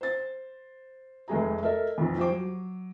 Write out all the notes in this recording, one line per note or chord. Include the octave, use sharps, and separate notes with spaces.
C5 A6
F1 G#3 A3 G#4 A#5
A4 A#4 D#5 E5
B1 F2
F3 G4 C5 D6
F#3